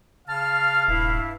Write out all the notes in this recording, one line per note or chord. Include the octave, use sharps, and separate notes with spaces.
C#3 F5 A5 F6
D#1 G2 E4